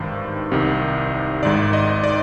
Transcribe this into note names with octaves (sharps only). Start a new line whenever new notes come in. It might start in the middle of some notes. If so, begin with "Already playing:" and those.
Already playing: G#1 G2 D#3 C5
C2 C3 D#3
G#1 G#2 D#3 D5
D#5
D5